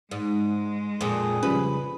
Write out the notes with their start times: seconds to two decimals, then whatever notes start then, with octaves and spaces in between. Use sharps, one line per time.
0.11 G#2 G#3
1.01 F2 A#2 G#4
1.43 C#3 F3 G3 B4